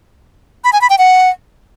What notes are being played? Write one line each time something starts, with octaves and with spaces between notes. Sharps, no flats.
B5
G#5
B5
G5
F#5